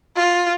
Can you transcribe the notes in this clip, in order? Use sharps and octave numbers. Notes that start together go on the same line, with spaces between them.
F4